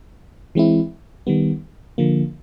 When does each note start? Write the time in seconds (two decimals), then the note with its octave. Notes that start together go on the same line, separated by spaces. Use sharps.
0.55 E3 G#3 C4 E4
1.27 D#3 G3 B3
1.98 D3 F3 A#3